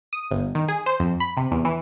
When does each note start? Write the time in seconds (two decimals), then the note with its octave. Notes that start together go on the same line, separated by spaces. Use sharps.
0.13 D#6
0.31 G1
0.55 D#3
0.68 G#4
0.86 C5
1.00 F2
1.20 B5
1.37 C3
1.51 E2
1.65 E3